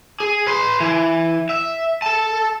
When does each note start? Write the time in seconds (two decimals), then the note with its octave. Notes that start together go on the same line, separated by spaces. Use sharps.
0.20 G#4
0.47 B4 C6
0.80 E3
1.49 E5
2.02 A4 A5